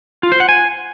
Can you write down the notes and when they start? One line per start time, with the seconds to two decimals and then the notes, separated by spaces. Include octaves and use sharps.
0.23 F4
0.32 C5
0.40 F#5
0.49 G#5